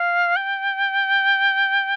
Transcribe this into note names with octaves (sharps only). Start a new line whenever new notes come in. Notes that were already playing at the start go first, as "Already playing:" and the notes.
Already playing: F5
G5